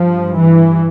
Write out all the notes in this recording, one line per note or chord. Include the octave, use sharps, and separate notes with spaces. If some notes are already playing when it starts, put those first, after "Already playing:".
Already playing: G2 F3
E3